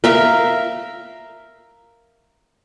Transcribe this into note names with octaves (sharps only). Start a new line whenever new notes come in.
A#4 E5 F5